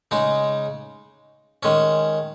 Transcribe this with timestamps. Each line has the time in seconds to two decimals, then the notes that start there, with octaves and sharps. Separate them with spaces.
0.11 C#3 G#3 D#4
1.63 D#3 G#3 C#4